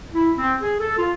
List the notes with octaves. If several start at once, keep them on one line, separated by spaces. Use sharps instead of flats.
E4
C4
G#4
A4
F4